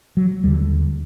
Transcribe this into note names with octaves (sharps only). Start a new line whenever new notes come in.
F#3
D#2 D3 G3